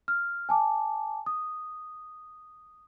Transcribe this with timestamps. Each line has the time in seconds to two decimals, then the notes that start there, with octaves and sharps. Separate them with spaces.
0.08 F6
0.49 G#5 A5 D6
1.26 D#6